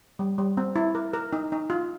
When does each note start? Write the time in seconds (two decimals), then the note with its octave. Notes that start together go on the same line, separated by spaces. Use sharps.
0.19 G3
0.38 G3
0.57 C4
0.76 E4
0.95 A#4
1.14 A#4
1.33 D#4
1.52 D#4
1.70 F4